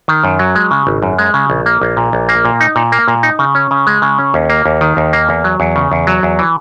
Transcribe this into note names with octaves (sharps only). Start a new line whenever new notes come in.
D#3
F#2
F#3
G#3
C#3
G#1
F#2
G#3
C#3
A#1
A#3
A#1
A#2
A#1
A#3
A#2
D#4
A#2
A#3
A#2
D#4
C#3
C#4
C#3
G#3
C#3
C#4
D#2
A#3
D#2
D#3
D#2
A#3
E2
F#3
E2
C#3
E2
F#3
E2
E3